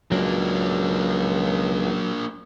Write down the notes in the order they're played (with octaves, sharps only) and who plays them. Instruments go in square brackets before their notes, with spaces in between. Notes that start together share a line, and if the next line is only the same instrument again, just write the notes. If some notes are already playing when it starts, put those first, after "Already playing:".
[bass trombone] C#2 [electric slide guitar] F#3 [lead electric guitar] A#3 D4